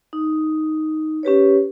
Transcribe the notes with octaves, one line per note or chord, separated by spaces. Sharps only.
D#4
C#4 G4 B4 C#5